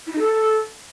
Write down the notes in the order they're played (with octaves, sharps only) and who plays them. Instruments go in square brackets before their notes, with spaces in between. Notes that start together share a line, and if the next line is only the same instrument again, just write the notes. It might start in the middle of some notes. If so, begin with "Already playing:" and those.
[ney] E4
D#4
A4